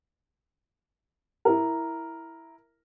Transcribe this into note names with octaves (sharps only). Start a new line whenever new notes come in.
E4 A#4